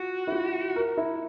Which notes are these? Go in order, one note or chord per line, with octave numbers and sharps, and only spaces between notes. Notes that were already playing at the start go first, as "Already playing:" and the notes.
Already playing: F4 F#4
E4
F4
A#4
E4